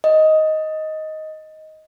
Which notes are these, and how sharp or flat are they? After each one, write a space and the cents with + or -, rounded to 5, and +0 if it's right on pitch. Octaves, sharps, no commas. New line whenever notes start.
D#5 +10